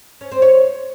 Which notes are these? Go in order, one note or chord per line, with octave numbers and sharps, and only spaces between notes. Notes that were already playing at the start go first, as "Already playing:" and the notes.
C#4
C4
C#5